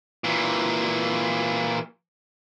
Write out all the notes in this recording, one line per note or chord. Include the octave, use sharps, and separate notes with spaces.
A#2 E3